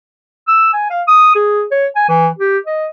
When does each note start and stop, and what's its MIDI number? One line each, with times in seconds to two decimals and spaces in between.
0.48 0.71 88
0.73 0.89 80
0.90 1.01 77
1.07 1.32 87
1.35 1.65 68
1.71 1.87 73
1.95 2.06 80
2.09 2.28 52
2.39 2.58 67
2.66 2.87 75